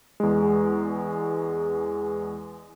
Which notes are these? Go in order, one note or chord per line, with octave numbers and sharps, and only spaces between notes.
E2 G#3